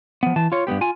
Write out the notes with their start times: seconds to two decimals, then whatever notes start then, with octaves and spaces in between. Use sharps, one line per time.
0.23 F3 B3
0.36 E3 A5
0.52 F4 C#5
0.67 G2 A#2 B3 G4
0.81 F4 G#5